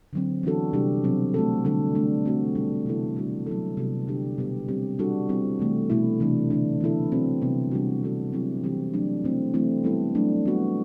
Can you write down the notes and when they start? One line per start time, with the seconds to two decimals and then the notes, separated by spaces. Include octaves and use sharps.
0.13 D3 F#3 C4
0.43 E3 B3 D4 F#4 A4
0.73 C3 G3 D4 G4
1.04 B2 F#3 C4
1.34 A3 C4 F#4 A4
1.65 D3 G3 D4 A4
1.95 D3 A3 D4
2.25 A3 C4 F#4
2.55 B2 G3 D4
2.86 C3 E3 B3 E4 A4
3.16 G3 D4 F#4 A4
3.46 F#3 B3 E4 A4
3.77 C3 G3 B3 F#4 A4
4.07 D3 G3 D4 G4
4.38 B2 G3 B3 D4 G4
4.68 G3 C4 G4
4.99 G3 D4 F#4 A4
5.29 G3 C4 E4
5.59 C3 E3 A3
5.90 B2 A3 E4
6.20 C3 E3 A3 D4
6.50 D3 A3 D4
6.81 E3 B3 E4 A4
7.12 F#3 C4 F#4 A4
7.42 C3 G3 B3
7.71 C3 G3 D4 F#4
8.02 A3 C4 F#4 A4
8.32 F#3 C4 E4 G4
8.64 E3 G3 C4 E4 G4
8.94 F#3 A3 D4
9.24 B2 A3 C4 E4
9.54 E3 A3 C4 E4
9.84 G3 B3 E4 A4
10.15 F#3 A3 D4
10.45 G3 B3 F#4